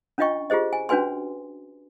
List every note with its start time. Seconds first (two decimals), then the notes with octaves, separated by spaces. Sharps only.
0.18 C#4 D4 F4 D#5 G5 C#6
0.50 F4 G4 G#4 C5 D#5
0.73 G#5
0.89 C#4 D4 F#4 B4 G#5 C6